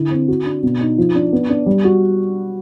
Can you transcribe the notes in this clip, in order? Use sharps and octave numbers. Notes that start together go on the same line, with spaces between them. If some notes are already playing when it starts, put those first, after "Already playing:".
Already playing: D3 E4
C4
F#4
D4
B2
D#4
F3
D4
B3
D4
G3
F#4